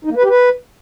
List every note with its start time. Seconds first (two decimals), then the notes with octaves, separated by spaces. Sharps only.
0.05 D#4
0.11 A#3
0.17 B4
0.23 G4
0.29 B4